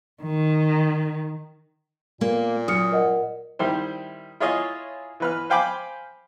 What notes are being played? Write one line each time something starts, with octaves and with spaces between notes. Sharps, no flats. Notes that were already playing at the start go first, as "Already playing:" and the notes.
D#3
A#2 A#3
F#2 D#6 F6 C#7
A#4 D#5 F#5
D#3 G3 E4 C5
E4 F4 G#4 C#5 D#5 F5
E3 B4 F6
C5 F5 G5 G#5 B5 D6